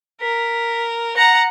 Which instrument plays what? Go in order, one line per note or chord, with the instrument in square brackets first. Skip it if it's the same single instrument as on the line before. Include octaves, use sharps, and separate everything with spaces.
[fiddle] A#4 [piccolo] B6
[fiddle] F#5 A#5 [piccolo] A#6